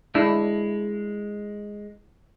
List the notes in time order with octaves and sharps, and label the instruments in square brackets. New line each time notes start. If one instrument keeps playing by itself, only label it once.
[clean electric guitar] G#3 [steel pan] D4 E4 E6